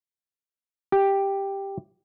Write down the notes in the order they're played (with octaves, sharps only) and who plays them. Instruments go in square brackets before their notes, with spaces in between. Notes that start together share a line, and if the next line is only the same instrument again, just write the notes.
[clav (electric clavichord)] G4